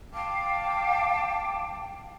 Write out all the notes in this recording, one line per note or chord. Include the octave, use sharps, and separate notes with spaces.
F5 G5 A5 D6